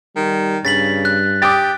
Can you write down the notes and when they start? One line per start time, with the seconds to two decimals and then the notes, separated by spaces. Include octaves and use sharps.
0.16 D#3 G3
0.65 G2 C#3 A6 B6 F#7
1.05 F#6
1.42 G4 D6 D#6 A6